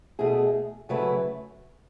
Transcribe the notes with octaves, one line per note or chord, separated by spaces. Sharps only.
B2 A3 E4 G#4
C#3 F#3 A3 E4 B4